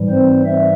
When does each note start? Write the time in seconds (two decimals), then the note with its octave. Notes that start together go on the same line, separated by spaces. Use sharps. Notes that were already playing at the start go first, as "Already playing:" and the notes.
Already playing: G#2 E3 G3
0.10 C4 C5
0.45 E5